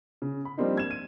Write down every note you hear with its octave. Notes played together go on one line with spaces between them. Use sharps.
C#3
B5
F3 G3 A#3 C4 D4 D#4
G#6 E7
D#7